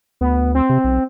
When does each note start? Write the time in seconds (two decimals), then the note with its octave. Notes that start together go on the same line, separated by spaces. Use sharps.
0.21 D2 B3
0.55 C4
0.69 C3
0.84 B1